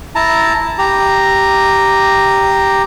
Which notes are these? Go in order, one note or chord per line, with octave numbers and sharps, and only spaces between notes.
E4 A5 A#5
G4 A#5